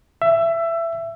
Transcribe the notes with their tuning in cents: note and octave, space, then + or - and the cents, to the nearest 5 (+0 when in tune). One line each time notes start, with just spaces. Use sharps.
E5 +20